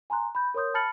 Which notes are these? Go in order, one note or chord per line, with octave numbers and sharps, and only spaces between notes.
G#5 A#5 C6 F#6
B5 G6
A#4 C#5 C6 D#6 G6
A5 B5 F6 A6 C#7 F#7